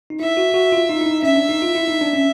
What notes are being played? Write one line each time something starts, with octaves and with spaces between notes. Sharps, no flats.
D#4
E4 E5
F#4
F#4
F4
D#4
E4
D#4
C#4 E5
D4
D#4
F4
E4
D#4
D4
C#4